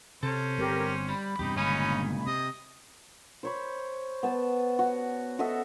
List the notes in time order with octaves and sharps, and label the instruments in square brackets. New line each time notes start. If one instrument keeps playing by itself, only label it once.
[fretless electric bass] C3 [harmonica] C#4 C5 [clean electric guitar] A4
[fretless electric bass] G1 C4 [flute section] G4 A#4
[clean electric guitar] G3 [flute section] B5
[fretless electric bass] E2 G2 C3 [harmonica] D#4 [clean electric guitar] G4
[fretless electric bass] G1 [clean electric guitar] C#2 A#2 G#5 [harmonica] C#4 D#4
[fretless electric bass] C3 [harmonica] D#5
[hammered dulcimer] C5 C#5 B5
B3 A5
F#4
F#4 A4 D#5 E5